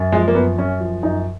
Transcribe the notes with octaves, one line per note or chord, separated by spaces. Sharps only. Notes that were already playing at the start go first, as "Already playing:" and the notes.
Already playing: F#2
F3 G#3
A#3
F#2 B3
F#2 C#4
F3
F#2 D#4